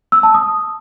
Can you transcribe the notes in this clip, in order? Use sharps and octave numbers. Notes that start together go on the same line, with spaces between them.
E6
A5
D#6